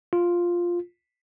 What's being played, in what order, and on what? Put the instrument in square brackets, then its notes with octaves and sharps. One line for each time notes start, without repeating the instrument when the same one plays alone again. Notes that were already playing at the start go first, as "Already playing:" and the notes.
[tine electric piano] F4